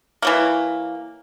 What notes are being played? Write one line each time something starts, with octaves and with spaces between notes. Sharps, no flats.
E3 F#3 A#3